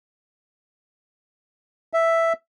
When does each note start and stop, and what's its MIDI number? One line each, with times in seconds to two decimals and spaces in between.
1.93 2.33 76